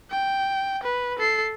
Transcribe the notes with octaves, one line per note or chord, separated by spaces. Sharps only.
G5
B4
A4 C7